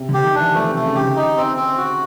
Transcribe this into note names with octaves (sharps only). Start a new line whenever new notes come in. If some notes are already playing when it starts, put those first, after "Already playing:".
Already playing: C3
D3 G4
D#3
E3 D4
F3 A3
C3 A3
C#3
D3 G4
D#4
C4
C4
F#4